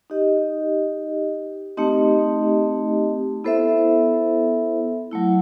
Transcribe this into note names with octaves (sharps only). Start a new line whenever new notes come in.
D#4 G4 D#5
A3 C4 D#4 G4 D#5
B3 E4 A4 C5 E5
F#3 A3 E4